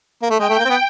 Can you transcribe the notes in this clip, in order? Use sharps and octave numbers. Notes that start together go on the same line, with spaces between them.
A#3
A3
G#3 G5
A3
A#3
C4
B3